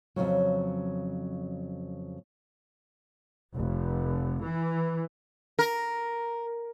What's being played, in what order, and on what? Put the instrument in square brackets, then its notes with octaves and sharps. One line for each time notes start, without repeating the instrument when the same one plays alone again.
[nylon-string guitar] F2 A#2 C#3 F#3
[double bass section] F1
E3
[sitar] A#4